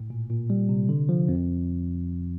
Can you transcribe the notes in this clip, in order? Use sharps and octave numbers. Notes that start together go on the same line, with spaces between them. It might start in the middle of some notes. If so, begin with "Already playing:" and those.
Already playing: A2
A#2
A#2
G3
C3
D3
F3
F2